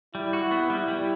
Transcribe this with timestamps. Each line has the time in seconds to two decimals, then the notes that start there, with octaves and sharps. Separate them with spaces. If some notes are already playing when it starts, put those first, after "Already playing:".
0.14 G3 E4
0.33 F#4
0.51 B3
0.70 G3 E4
0.88 G3